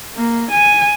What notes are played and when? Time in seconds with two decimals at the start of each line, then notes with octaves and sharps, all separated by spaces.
0.16 A#3
0.51 G#5